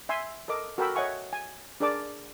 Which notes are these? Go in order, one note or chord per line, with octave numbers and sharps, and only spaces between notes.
E5 G#5 C6 E6
A4 A#4 D#5 D6
F#4 A4 A#4 G5 B5 E6
C#5 D#5 E5 F#5 G#5 C#6
G#5
D4 G#4 A#4 D5 A5 D6